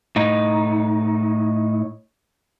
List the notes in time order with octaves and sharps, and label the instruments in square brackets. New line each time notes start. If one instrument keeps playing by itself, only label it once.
[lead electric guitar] A2 D#4